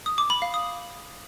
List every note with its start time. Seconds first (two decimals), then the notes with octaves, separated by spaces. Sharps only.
0.06 D#6
0.18 D6
0.30 B5
0.42 F5
0.54 D#6